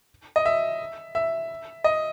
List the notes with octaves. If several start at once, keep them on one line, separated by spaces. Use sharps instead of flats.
D#5
E5
E5
D#5